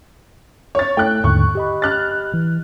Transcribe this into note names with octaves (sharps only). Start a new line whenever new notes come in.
C#5 A6
A3 E4 A4 G5 F#6
D#2 G#2 D3 C#6
G4 D#5 B5
F6 F#6 A6
E3